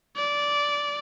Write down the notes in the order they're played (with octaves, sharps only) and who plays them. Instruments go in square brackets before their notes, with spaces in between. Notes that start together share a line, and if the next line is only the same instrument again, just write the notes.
[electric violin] D5